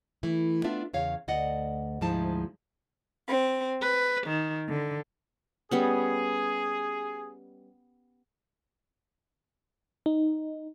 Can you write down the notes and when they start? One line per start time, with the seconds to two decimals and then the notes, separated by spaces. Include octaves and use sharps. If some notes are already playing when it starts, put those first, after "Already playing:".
0.23 E3 A3 E4
0.64 B3 D4 F4 E5
0.93 E2 C#3 C#5 F5
1.28 D2 D5 D#5 F#5
2.01 D2 G#2 F3 G#3 E4 A5
3.27 C4
3.81 B4
4.26 D#3
4.69 D3
5.71 G3 B3 C#4 G#4
10.06 D#4